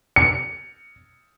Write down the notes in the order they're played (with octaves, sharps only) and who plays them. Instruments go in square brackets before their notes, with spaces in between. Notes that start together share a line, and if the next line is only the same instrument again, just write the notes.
[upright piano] C#7